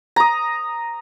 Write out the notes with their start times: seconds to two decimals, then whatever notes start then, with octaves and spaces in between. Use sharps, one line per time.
0.16 A#5 D#6